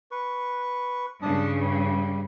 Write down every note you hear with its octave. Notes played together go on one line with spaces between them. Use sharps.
B4 C#6
G2 C#3 D4 A5 D#6
G3